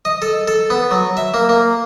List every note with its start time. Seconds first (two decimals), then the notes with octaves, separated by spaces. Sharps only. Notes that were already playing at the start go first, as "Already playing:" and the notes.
0.05 D#5
0.22 A4
0.48 A4
0.70 B3
0.91 F#3
1.17 E5
1.34 A#3
1.49 A#3